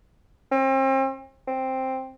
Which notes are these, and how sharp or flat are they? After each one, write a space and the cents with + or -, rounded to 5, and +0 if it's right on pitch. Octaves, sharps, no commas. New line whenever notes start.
C4 +40
C4 +5